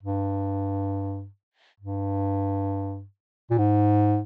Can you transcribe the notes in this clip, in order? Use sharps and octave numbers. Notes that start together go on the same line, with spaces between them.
G2
G2
A#2
G#2